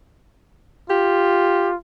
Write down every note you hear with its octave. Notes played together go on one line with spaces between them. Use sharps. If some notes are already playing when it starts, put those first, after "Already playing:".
F4 G4